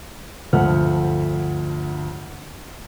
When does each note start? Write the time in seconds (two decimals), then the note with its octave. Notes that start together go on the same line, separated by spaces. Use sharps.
0.53 D2 G2 F3 A4 F#5 F6